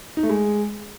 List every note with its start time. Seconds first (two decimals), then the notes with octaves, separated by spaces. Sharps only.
0.17 D#4
0.23 A3
0.29 G#3